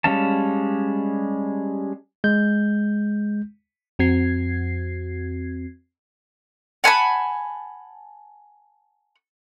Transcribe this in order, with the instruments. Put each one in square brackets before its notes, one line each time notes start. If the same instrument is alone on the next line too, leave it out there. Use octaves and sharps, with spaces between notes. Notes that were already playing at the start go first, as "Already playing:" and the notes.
[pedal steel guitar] G3 G#3 C#4 F5 A5
[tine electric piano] G#3 G6
[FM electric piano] F2 C4 F#4 G#6 C7
[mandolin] F#5 G#5 A5 B5